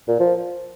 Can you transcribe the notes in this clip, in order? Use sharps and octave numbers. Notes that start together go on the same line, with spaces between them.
A#2
F3